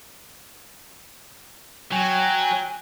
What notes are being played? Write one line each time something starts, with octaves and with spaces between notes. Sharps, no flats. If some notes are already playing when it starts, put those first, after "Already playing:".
F#3 G5 G#5